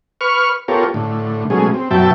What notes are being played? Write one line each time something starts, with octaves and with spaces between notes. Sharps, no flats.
B4 C#6 F6
B3 F4 G4 A4 A#4 C#5
A2 D3
B2 F#3 G#3 A3 C#4 G#4
C4
F#2 B2 F#3 E5 G5 A5